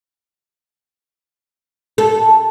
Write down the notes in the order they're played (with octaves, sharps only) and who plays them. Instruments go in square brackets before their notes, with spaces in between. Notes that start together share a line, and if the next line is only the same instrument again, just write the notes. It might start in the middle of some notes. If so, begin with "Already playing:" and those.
[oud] A4